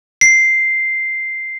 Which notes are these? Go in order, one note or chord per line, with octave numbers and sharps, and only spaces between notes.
C7